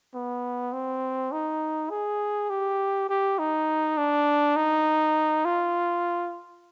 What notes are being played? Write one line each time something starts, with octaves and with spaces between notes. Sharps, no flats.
B3
C4
D#4
G#4
G4
G4
D#4
D4
D#4
F4